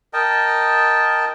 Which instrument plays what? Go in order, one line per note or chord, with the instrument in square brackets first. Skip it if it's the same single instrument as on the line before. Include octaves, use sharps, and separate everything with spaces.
[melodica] A#4 D#5 G5 A5